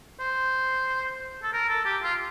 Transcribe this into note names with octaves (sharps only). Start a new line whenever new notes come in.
C5
A4
A#4
A4
G4
F4